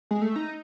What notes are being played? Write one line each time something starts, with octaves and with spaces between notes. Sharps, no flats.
G#3
A3
D#4